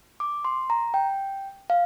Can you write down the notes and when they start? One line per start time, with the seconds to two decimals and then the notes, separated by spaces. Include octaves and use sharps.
0.20 D6
0.45 C6
0.70 A#5
0.94 G5
1.70 F5